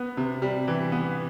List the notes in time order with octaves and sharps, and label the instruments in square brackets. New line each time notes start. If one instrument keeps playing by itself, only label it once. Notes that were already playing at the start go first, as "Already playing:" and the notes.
Already playing: [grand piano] B3
C3
G3
E3
B3